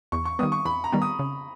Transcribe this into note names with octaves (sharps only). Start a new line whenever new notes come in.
E2 C#6
C#6
D#3 G3 B3 D#6
C#6
E2 B5
A#5
D#3 G3 B3
D#6
C#3